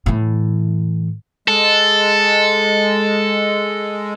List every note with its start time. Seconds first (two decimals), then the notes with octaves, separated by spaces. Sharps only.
0.06 A2 E3
1.48 G#3 A4